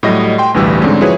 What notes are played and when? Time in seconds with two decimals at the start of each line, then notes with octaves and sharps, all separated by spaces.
0.03 A2 F#3 G3 A3 D#5 A#6
0.38 G5 C6
0.54 A1 D2 B2 E3 G3 E6
0.81 G#2 D3 G3 G#3 C4 C#4
1.01 F3 E4 F#4 G#4 B4 C#5